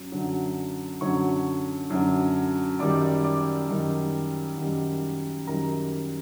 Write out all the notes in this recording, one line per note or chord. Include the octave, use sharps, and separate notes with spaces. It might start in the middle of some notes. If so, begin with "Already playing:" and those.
Already playing: F#2 F#3
F#2 D3 F#3
F#2 D3 F#3 C#5 C#6
F#2 D3 F#3
F#2 D#3 G3 D5 D6
D5 D6
F#2 D#3 G3
F#2 D#3 G3
F#2 D#3 G3 A#4 A#5